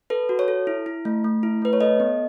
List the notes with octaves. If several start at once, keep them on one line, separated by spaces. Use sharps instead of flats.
A4 B4
F#4
C#5
A4
E4
E4
A3
A3
E4
A3 B4
C#5
A4 D#5
B3